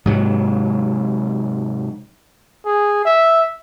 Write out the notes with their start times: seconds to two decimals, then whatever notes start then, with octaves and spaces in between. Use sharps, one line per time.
0.06 G#2 C3 F#3
2.65 G#4
3.05 E5